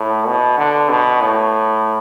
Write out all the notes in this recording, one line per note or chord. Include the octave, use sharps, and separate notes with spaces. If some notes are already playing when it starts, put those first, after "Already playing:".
Already playing: A2
B2
D3
B2
A2